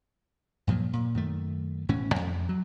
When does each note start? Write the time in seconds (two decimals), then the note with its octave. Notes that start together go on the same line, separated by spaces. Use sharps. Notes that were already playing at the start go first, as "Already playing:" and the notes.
0.67 G2 A#2 F3 F#3
0.93 A#2
1.14 F#2 D#3 A3
1.89 E1 A2 E3 C#4
2.16 F2
2.49 F#3